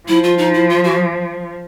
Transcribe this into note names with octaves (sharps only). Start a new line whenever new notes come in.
F3 E4
F4
D#4
E4
F4
F#4